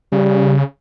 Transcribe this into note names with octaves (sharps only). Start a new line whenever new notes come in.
C#3 G3